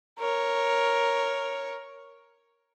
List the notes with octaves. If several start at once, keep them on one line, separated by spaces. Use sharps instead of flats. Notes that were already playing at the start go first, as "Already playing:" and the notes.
A#4 C#5